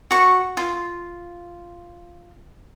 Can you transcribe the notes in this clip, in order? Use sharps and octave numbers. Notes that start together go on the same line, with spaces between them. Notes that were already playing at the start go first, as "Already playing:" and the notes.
F#4 C#6
F4